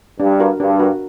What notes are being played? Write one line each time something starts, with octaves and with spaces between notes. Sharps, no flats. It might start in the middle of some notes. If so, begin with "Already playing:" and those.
G2 D4
F#4 A#4
G2 D4
F#4 A#4